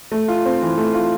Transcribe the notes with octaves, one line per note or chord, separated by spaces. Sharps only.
A3
F4
C4
E3
A3
F4